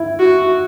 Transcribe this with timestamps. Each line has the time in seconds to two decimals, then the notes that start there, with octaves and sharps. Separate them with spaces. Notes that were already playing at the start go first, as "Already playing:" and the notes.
Already playing: E4
0.19 F#4